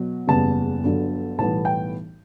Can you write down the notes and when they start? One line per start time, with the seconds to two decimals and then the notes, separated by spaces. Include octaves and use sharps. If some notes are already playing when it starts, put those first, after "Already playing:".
Already playing: B2 F#3
0.28 F#1 E2 C#3 G3 B3 A5
0.83 G1 G2 D3 F#3
1.38 B1 A2 E3 G3 B3 A5
1.65 G5